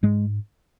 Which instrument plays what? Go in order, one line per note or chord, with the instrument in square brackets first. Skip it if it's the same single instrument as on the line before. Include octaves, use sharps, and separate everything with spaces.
[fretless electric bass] G#2 G#3